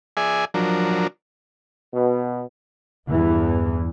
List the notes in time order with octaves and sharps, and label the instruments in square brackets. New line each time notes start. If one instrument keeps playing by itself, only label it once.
[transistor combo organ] G#4 D5 E5 G#5
F3 F#3 D4 A#4
[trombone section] B2
[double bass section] E2 G2 E3